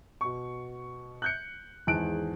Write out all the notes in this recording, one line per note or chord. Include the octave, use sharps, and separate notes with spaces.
B2 C#6
F#6 G6 C#7
G#1 E2 G#4 A5 F#6 D7